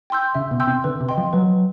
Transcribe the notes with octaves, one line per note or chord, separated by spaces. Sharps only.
G5 C6 E6 G6
C#3 E5
B2
G5 C6 E6 G6
C3
D3 B4
C3
D#5 G5 C6
F3
F#3 B4